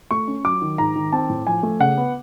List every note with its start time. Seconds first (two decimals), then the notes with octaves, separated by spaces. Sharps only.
0.11 A3 C#6
0.28 C#4
0.44 F#3 D6
0.62 D#3
0.78 G#2 A#5
0.95 D#3
1.12 C4 A5
1.29 A2
1.47 F3 G#5
1.63 A3
1.80 C#3 F#5
1.97 B3